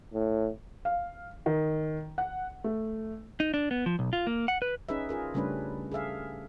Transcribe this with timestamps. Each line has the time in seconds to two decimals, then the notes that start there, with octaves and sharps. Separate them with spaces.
0.13 A2
0.85 F5
1.46 D#3
2.18 F#5
2.64 A3
3.40 D#4
3.54 D4
3.71 B3
3.86 F3
3.99 B1
4.13 F4
4.27 A#3
4.48 F#5
4.62 B4
4.89 C#4 D#4 G#4 B4 E5
5.09 F4 G#4 A#4
5.34 C#3 G3 A3 C#4 D4 B4
5.92 G#4 A4 E5 F5